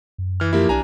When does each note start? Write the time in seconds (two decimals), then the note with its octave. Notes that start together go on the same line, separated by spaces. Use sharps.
0.18 F#2
0.40 E3 F6
0.53 F3 A#3 E4 G4
0.69 B1 D4 G#5 A#5